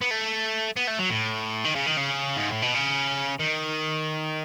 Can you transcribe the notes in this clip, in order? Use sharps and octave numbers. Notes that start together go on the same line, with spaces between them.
B3
A3
B3
A3
F#3
A2
D#3
C#3
D#3
C#3
G#2
A2
B2
C#3
D#3